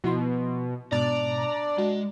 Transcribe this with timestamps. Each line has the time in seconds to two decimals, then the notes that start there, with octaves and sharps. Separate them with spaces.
0.04 B2 F3 E4 C6
0.92 G#2 B2 D4 D5 A#5
1.78 G#3 F#4